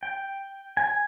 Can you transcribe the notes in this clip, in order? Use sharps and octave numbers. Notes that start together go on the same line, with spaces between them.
G5
G#5